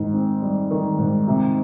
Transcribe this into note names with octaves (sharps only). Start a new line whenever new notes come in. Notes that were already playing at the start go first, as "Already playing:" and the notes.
Already playing: G#2 D#3
C4
G3
D#3
G#2
C3